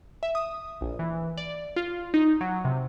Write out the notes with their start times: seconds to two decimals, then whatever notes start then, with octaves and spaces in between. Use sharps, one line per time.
0.23 E5
0.35 D#6
0.81 A#1
0.99 E3
1.37 D5
1.76 F4
2.14 D#4
2.41 F#3
2.65 C3